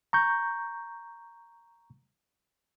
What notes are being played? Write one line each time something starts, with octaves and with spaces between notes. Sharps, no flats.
A#5 C#6 G6